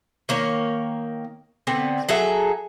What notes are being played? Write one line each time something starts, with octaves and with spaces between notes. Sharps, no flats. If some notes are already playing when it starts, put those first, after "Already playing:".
D#3 A#3 A#4 C#5
D3 B3 C4
F#3 G#4 A4 E5